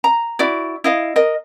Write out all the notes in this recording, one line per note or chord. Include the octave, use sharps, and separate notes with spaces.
A#5
E4 F#4 D5
E4 D#5 F5
A#4 D#5